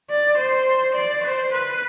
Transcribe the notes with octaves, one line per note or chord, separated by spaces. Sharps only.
D5
C5
D5
C5
B4